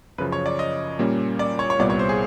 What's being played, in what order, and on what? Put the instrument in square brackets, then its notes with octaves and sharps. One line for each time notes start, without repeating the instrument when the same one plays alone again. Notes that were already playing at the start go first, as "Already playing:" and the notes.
[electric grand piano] F#2 C#3 F3 [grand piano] B4
[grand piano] C#5
D5
D#5
[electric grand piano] A#2 G3 A#3 C#4
[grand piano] D5
C#5
C#5
[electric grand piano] C2 A#2 G3 B3 [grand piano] D5
[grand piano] C#5
C5
G#4